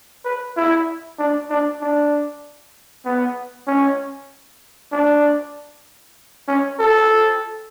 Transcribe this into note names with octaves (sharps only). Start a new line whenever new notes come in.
B4
E4
D4
D4
D4
B3
C#4
D4
C#4
A4